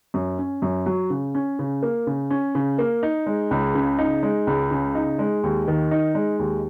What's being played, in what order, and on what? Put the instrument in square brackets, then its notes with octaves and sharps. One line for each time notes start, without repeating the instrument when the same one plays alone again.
[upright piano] F#2
C#4
F#2
F#3
C#3
C#4
C#3
A#3
C#3
C#4
C#3
A#3
D#4
G#3
C#2
C#3
D#4
G#3
C#2
C#3
D#4
G#3
D#2
D#3
D#4
G#3
D#2